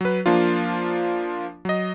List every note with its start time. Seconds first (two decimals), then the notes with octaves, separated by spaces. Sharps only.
0.01 F#3 B4
0.26 F3 A#3 D4 F4
1.65 F#3 D#5